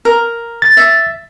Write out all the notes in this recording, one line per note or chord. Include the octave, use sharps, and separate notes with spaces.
A#4
A6
E5